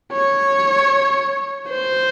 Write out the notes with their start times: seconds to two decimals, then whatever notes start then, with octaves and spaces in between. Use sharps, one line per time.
0.13 C#5
1.70 C5